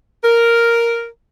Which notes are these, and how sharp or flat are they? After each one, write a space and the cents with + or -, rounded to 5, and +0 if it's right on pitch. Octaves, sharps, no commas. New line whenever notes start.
A#4 +0